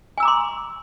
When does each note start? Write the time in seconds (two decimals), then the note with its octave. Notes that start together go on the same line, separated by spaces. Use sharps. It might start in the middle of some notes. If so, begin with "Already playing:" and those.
0.18 G#5
0.20 E6
0.23 A#5
0.25 D6
0.28 C6